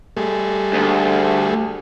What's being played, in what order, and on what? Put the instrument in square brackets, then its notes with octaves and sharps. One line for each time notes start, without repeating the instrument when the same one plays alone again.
[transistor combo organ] G3 A3 G#4
[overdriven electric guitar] D2